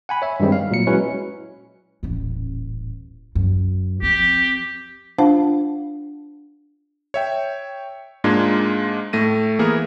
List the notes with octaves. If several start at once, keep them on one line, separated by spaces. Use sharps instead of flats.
F#5 G#5 B5
C#5 E5
G2 D#3 G3 G#3 C4
F5
A#2 F#3 C#7
F#3 G#3 C#4 E4 F#4 B4
D#1 A1
F#2
F3 C4 G4
D4 F4 C5 F5 F#5 A5
C#5 E5 G5
G#2 G#3 A#3 D4 F4 G#6
A2 A3 A#6 D#7
E3 A#3 B3 E4 G#4 A#4